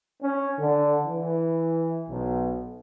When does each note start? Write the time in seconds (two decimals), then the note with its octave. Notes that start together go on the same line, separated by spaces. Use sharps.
0.22 C#4
0.59 D3
1.07 E3
2.09 B1